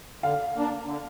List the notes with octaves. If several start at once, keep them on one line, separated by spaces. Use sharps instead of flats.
D3 F5
A#3 D4
D3